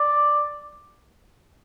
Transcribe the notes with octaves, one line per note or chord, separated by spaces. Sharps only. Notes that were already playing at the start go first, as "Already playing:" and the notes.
Already playing: D5